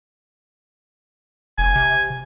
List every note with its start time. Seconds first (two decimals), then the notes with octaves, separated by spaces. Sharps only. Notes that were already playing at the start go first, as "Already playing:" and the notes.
1.58 F1 G#5
1.76 C3